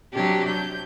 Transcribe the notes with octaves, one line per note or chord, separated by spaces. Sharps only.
C3 F#3 D4 G4
G6